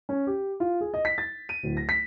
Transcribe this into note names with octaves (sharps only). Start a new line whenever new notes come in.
C#4
G4
F4
G#4
D#5
B6
A6
D#7
D1
A#6
B6